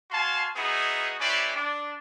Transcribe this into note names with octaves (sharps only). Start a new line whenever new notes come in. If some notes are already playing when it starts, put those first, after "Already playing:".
F#4 F5 G#5 A5 C6
B3 D#4 E4 F#4 G#4
C#4 E4 G4 B4 C5 D5
D4